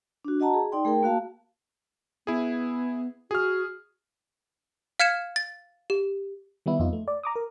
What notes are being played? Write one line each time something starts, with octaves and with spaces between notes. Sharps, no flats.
D4 F#4
F#4 D#5 F#5 A5 A#5
G#4
D#4 D5 G5 C6
A3 G#4 A#4 G5
A#3 F#4 F5 A5
B3 E4 G#4
F#4 G#4 F6
F5 F6 G#6 C#7 E7
A6
G4
D#3 G3 B3 E4
F2 B3 D#4 F4
A3
D5
A#5 D6 D#6
A#4